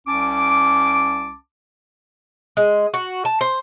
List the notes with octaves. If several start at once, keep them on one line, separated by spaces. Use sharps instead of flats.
C2 C#4 A5 D6
G#3
F#4
A5
C5